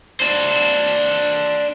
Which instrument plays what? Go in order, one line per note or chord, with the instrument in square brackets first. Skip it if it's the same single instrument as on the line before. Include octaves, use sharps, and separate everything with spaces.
[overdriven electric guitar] D4 C5